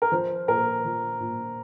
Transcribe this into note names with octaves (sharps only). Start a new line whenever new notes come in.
A#4
F3 C5
A#2 A#4
F3
A#2